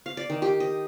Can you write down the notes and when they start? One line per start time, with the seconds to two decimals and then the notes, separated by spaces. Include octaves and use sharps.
0.06 F5
0.17 D5
0.30 D#3
0.42 G4
0.60 D#5